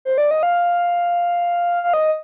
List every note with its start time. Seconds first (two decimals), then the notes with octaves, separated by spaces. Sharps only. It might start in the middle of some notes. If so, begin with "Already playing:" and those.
0.05 C5
0.18 D5
0.31 D#5
0.43 F5
1.84 F5
1.94 D#5